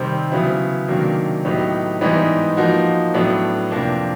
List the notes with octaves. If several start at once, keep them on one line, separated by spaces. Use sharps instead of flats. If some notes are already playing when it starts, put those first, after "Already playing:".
Already playing: C3 D#3 G3 C4
C#3 F#3 B3 E4
C3 D#3 F#3 A#3 D4
A2 F#3 B3 D#4 G4
G#2 E3 G3 B3 D#4
F3 A#3 D#4 F#4
A2 F#3 B3 D4
F2 C3 F3 A#3 D4